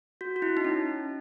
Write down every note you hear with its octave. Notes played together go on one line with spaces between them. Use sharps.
F#4
F#4
E4
D#4
C#4